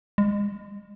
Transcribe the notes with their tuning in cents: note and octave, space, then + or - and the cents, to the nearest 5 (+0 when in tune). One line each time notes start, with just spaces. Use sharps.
G#3 -30